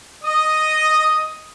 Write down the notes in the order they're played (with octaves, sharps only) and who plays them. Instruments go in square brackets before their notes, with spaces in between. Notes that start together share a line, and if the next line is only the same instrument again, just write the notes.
[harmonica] D#5 D#6